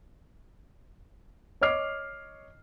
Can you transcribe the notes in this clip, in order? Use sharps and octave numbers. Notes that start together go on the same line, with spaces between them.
C#5 D#5 D6 F6 C7